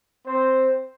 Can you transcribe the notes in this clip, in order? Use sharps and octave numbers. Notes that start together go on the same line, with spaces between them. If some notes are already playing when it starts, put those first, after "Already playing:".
C4 C5